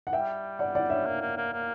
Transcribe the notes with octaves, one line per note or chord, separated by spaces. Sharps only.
F#5
G3 E5 G5
D5 F#5
D5 F#5
C#5 E5
A#3
A#3
A#3
A#3